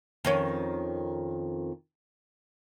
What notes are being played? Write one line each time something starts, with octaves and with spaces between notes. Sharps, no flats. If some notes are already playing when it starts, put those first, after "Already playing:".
F2 D#3 C#4